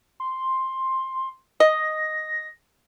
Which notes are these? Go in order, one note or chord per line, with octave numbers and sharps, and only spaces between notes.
C6
D#5 A#6